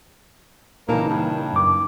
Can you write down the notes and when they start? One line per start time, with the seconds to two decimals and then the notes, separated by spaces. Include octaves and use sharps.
0.89 A#2 C#3 E3 A#3 D#4 A5
1.09 G2
1.53 F#2 D6